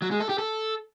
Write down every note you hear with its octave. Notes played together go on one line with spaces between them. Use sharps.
F#3
G#3
A4
G4
A4